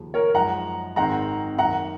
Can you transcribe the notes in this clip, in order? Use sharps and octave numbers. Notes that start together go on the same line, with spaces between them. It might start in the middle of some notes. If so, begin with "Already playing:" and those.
Already playing: D#2 C#3 F3
A#4 C#5
F#2 F3 G#3 D#4 F#5 A#5
G#1 G#2 D#3 G#3 C4 F#5 A#5
F#2 D#3 A#3 F#5 A#5